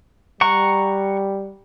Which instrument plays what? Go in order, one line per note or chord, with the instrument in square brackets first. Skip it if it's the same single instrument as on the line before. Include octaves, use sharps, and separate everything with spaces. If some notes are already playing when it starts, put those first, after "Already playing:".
[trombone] G3 [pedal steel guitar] F#5 A#5 C#6